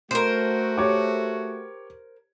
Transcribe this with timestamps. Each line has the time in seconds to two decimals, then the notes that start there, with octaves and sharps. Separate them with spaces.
0.11 A3 F#4 A#4 C5
0.78 G4 C#5 D6